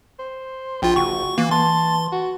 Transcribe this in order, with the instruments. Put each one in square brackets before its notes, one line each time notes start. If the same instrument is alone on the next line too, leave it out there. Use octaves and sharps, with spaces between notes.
[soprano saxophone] C5
[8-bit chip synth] A#1 F4 [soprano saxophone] G5
[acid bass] F#1 [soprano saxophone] F#4 [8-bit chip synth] C#6
[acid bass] E3 [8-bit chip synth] A#3
[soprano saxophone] A5 [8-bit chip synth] C6
[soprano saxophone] F#4